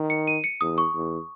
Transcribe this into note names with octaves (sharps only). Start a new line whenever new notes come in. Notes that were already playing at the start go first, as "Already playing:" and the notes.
Already playing: D#3
C#7
D#7
C#7
E2 D#6
C#6
E2